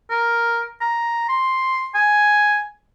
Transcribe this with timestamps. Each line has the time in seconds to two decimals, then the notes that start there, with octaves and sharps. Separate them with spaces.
0.10 A#4
0.81 A#5
1.29 C6
1.95 G#5